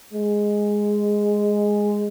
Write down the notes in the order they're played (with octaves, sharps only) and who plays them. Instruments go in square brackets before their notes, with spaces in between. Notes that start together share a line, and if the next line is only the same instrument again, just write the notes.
[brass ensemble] G#3